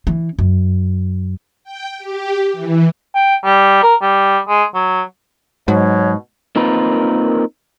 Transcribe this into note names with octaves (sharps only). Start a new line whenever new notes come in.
E3
F#2
G5
G4
E3
G5
G3
A#4
G3
G#3
F#3
G#2 B2 F#3 C#5
A#3 C4 D#4 F4 A#4 B4